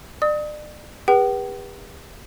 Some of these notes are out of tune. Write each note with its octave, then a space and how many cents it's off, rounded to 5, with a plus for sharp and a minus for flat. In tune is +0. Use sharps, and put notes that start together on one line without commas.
D5 +35 D#6 +30
G4 +45 B4 -30 G5 -45